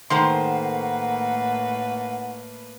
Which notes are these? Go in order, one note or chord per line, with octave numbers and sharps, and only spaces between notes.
A2 D#3 A3 A#3 B4 C5 F#5 C6